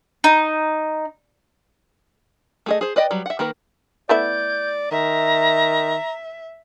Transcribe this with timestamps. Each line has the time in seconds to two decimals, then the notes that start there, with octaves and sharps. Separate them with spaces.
0.24 D#4
2.66 A3 G#4 D#5
2.81 G#4 C5
2.96 B4 D5 D#5 G5
3.11 F#3 G3
3.26 E5 F#5
3.39 D#3 A#3 A#4 B4
4.09 A3 B3 E4 D5 G6
4.91 D#3 E5 A#5